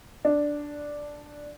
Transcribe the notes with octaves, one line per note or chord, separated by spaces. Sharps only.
D4